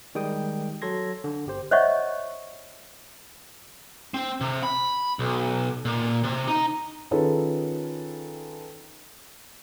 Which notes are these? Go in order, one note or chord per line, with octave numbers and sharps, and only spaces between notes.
D#3 G3 G#3 G5 D#6
F#3 A4 C6 G#6 A#6
D3
G1 G4 C5
C5 C#5 D#5 E5 F#5 C#6
C4
C3
B5
B1
A#2
C3
D#4
D#3 C#4 F4 G#4 A4 B4